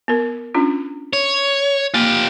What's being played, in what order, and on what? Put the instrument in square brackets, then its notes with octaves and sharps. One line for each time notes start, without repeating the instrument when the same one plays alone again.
[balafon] B3 A#4
C#4 D4 F4
[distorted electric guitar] C#5
[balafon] A#3 [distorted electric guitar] F4 G4